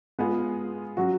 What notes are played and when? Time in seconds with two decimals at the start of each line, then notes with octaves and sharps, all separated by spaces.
0.19 G#3 B3 F4 G#4
0.97 F#3 C#4 F#4